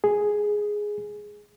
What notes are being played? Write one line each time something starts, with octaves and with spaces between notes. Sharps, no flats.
G#4